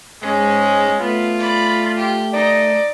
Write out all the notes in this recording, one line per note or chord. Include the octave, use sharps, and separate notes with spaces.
G#2 G#3 C#4
A3 B3 F4
D5 B5
G4
D#4 D5